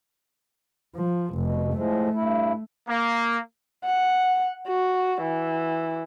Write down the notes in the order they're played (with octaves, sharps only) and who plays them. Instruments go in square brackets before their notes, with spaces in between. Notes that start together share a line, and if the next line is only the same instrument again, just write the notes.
[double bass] F3
[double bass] F1 [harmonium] B2
[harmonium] A2 F3 G#3 [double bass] A3
[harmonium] G2 E4
[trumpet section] A#3
[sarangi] F#5
F#4
E3